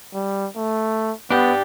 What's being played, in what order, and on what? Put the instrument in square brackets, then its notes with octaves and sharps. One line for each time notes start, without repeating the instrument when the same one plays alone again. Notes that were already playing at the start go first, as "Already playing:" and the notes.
[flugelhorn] G3
A3
[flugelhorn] B3 [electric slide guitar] D4 G4